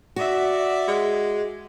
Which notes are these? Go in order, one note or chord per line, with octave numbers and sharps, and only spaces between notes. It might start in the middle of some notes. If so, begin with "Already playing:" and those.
F#4 D5 E5
G#3